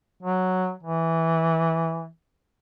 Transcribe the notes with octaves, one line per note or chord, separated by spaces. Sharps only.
F#3
E3